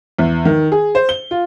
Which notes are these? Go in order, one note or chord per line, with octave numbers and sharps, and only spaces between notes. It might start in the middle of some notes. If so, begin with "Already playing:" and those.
E2
D#3
G#4
C5
G7
F4